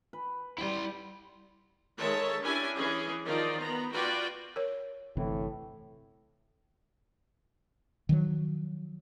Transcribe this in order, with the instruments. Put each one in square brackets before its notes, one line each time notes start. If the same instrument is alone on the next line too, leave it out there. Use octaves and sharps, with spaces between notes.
[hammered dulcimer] B4
[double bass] G3 [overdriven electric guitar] E4 C6 [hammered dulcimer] F#5
[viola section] D#3 G#3 A4 C#5 E5 A5
C#4 D4 E4 G4 G#5
E3 C#4 G#4
D#3 F3 D#4 F4 D5
B3 A#5
F4 F#4 B4 D5 G5
[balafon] A#4 C#5
[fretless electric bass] G1 C3 E3 [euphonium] A2
[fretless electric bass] D#3 F3 F#3